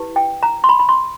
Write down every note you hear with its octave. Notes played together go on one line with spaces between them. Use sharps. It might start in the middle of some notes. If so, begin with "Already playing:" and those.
Already playing: E4 G4 B4
G5
A#5
C6
B5
B5
C6